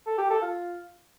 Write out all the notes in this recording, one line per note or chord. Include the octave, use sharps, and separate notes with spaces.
A4
G4
A4
F4